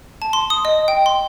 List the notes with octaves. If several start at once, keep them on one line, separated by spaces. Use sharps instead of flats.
A5
C6
D#6
D#5
G5
C6